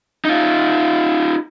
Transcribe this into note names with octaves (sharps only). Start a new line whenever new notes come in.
D#4 F4